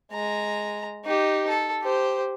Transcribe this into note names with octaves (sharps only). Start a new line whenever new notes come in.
G#3 A#5
D#4 G4
A4
G4 C5